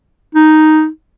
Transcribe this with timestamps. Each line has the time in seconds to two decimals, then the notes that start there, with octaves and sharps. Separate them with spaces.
0.35 D#4